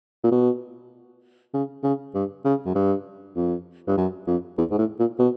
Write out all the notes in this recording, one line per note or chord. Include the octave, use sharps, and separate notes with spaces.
A#2
B2
C#3
C#3
G2
C#3
F#2
G2
F2
G2
F#2
F2
E2
G#2
A2
A#2
B2